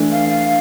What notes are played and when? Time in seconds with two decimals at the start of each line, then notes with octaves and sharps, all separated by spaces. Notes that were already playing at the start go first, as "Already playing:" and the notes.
Already playing: E3 A3 D4
0.11 F5
0.29 F5